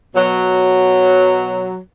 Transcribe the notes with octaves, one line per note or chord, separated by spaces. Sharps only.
B2 F#3